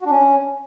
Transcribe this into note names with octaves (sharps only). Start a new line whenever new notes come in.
F#4
D4
C#4